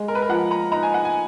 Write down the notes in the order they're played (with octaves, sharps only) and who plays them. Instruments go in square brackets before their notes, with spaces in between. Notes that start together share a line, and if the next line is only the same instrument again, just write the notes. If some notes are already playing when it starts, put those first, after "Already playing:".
Already playing: [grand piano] G#3
[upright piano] A#4
B4
A#4
[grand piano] F3 [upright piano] F#5
[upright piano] A#5
[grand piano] D#4 [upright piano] A#5
[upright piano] G#5
F#5
G#5